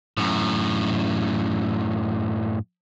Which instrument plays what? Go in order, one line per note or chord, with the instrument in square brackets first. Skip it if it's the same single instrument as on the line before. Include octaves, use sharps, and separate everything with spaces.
[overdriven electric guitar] F#2 A2